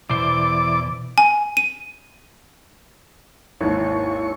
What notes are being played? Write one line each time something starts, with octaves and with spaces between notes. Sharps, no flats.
E2 B2 E3 C5 D5 D6
G#5
D#7
G#1 D#2 E4 C#5 C#6